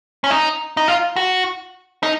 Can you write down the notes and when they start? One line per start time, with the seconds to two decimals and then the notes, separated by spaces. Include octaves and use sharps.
0.24 C#4
0.30 D#4
0.77 D#4
0.88 F4
1.16 F#4
2.03 D#4